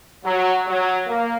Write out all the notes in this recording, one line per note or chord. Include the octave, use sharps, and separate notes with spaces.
F#3
F#3
A#3